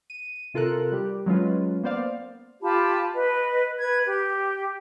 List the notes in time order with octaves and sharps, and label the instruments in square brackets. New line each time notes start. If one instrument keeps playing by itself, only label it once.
[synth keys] D#7
C3 F4 A4 A#4 F#6
G3 G4
F#3 G#3 C#4 F4 B4
A#3 B3 C5 D5 F5
[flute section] F4 G4 A5 B5
B4 D#5
B4 G#6
G4